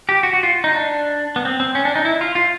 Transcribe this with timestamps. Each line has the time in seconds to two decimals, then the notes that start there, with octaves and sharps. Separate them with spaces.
0.09 G4
0.23 F#4
0.33 F#4
0.43 F4
0.64 D#4
0.74 D4
1.36 B3
1.45 C4
1.60 C4
1.75 C#4
1.85 D4
1.96 D#4
2.05 E4
2.21 F4
2.35 F4